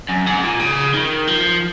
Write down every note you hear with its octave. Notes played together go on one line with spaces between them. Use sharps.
F#2
G#2
A#2
C#3
D#3
F3